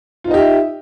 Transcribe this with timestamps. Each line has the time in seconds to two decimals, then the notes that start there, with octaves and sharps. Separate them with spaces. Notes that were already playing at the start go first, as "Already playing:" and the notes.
0.24 F4
0.28 D#4
0.31 D#5
0.34 G4
0.37 E5